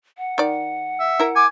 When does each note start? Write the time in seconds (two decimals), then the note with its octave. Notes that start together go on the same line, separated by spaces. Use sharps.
0.18 F#5
0.38 D#3 D5
1.00 E5
1.20 E4 A#4
1.36 G#5 D6